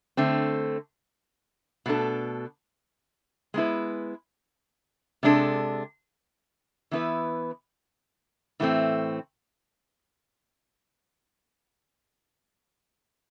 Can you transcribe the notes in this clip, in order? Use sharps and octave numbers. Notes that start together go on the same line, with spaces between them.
D3 A3 C4
B2 A3 D4 A4
G#3 B3 E4 B4
C3 G#3 D4 A4
E3 B3 E4 B4
A2 E3 A3 C4